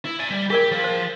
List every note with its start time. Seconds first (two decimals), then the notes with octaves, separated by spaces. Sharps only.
0.05 E4
0.19 D5 G#5
0.31 G3
0.50 G4 G#4 A#4 D5
0.72 F3
0.84 C5